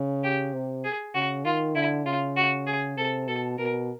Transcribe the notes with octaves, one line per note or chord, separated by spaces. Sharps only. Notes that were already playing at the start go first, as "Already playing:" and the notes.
Already playing: C#3
G4
C3
G#4
C#3 F#4
D#3 F4
D3 E4
C#3 F4
F#4
G#4
C3 A4
B2 A4
B2 A#4